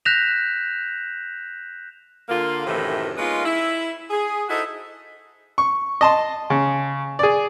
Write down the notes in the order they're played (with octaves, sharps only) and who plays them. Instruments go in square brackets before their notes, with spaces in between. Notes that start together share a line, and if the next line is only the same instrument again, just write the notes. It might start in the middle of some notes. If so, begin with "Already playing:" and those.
[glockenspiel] F#6 G6 A#6 B6 E7 F7
[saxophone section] D3 A#3 F4
F#2 A2 C3 D#3 E3
G#3 A#3 B3 C#4 D#4 F4
E4
G#4
D#4 E4 F#4 A4 C5 D#5
[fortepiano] C#6
D#5 A5 C6
C#3
G#4 D5